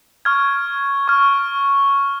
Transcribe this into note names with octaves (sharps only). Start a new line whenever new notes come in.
C#6 F6 G#6
C#6 F6 G#6